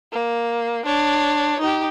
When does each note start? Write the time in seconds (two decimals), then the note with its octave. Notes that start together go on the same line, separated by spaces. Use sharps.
0.12 A#3
0.85 D4 C#5
1.60 D#4 G4